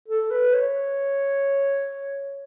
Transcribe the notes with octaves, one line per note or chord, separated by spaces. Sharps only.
A4
B4
C#5